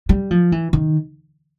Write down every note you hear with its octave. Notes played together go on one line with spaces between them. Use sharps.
G3
F3
E3
D#3